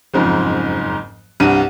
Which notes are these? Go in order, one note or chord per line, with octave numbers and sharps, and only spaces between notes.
F#1 F2 G#2
C2 G2 F#5 D#7